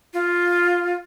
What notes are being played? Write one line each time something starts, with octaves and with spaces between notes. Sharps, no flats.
F4